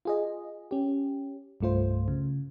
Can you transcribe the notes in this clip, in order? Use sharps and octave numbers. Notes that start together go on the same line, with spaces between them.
F4 G#4 D#5
C#4 G4
C2 G2 A3 F4 C5
C#3